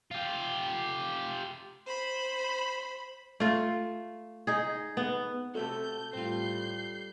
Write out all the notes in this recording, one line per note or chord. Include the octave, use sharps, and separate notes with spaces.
F4 G4
C5 B5
A3 F4
D#4 G#4
B3
C3 A3 F#4 A4 G6
A2 G3 C4 F4 G6 C7